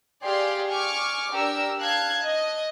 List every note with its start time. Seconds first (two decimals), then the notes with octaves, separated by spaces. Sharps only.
0.24 G4 G#4 D5 F5 C6
0.70 G#5 C#6 D6 F6
1.32 D4 G4 A#4 E6
1.79 F5 A5 F#6 G#6
2.23 D#5